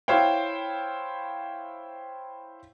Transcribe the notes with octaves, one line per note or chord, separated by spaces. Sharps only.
E4 C5 C#5 F5 G5